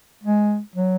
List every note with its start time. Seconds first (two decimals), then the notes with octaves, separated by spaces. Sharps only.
0.23 G#3
0.75 F#3